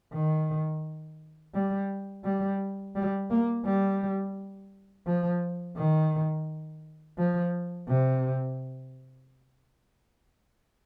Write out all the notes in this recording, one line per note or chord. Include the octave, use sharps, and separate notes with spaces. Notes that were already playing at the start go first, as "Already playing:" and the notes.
D#3
G3
G3
G3
A#3
G3
F3
D#3
F3
C3